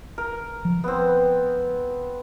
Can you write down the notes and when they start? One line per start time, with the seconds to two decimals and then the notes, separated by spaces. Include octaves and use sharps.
0.18 A#4
0.65 F3
0.84 B3 C4